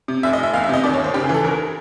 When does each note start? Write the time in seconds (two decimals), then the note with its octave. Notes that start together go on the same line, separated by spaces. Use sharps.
0.08 C3
0.23 F1 E5
0.33 D#5
0.38 F1
0.43 E5
0.53 E2 F5
0.64 E5
0.69 C3 D#5
0.84 D#2 D5
0.93 C#5
0.99 D#2 C5
1.14 C#3 G4
1.24 G#4
1.29 E3
1.34 A4
1.44 D#2 A#4